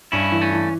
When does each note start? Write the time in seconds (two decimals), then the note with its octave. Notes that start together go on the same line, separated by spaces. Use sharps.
0.12 G2 C#4 E4
0.32 E3
0.41 A3 C#4
0.52 E3